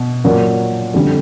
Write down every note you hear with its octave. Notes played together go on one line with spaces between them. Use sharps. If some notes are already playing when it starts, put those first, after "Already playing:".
Already playing: B2
A#2 F#3 A#3
F2 D3 G3